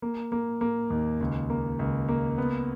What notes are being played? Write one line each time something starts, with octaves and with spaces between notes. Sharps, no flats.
A#3
A#3
A#3
D#2
C#2
A#3
C#2
A#3
B3